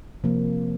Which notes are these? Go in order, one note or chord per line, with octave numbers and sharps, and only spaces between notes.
C3 F3 A#3